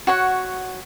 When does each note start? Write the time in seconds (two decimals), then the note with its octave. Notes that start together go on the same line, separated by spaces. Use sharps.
0.07 F#4 C#5 F#5